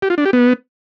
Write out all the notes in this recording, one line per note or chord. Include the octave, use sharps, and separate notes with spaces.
G4
F4
D4
G4
B3